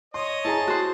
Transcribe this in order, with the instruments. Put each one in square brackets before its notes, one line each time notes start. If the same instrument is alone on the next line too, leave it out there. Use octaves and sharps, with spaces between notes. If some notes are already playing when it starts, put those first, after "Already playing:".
[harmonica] C#5 D#5 [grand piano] C6
[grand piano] E4 G#4 A#5 [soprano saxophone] A5
[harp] F#4 C5